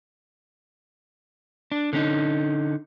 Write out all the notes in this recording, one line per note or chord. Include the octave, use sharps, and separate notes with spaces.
D4
D3 C#4 D#4